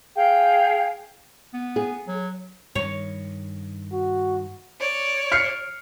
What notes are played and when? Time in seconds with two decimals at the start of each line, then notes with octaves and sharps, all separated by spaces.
0.15 G#4 F5 G5
1.54 B3
1.76 G#4
2.08 F#3
2.75 G2 D#3 C#5
3.93 F#4
4.80 C#5 D5
5.32 F6 C7 C#7